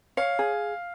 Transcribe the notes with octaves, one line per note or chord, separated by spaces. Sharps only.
C#5 F5
G#4